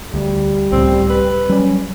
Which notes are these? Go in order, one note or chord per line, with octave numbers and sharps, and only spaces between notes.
D2 G3
C#2 A2 C4
B4
F#3 G3 C#4